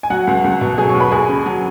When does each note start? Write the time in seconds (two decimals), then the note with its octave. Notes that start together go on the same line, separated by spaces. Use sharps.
0.03 G#5
0.10 F#3 F#4 F#5
0.27 C#2
0.44 C#2
0.61 B2
0.78 F#3 G#4 G#5
0.89 C#5 C#6
0.95 D#2
1.00 B4 B5
1.12 D#2 G#4 G#5
1.29 C#3
1.46 F#3